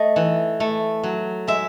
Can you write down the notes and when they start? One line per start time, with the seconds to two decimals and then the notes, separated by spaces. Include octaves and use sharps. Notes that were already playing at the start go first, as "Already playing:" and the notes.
Already playing: A3 D#5
0.16 E3
0.60 A3
1.03 F#3
1.48 G#3 E5